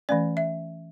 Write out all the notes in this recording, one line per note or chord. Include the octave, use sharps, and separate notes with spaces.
E3 A3 C#4 D5
E5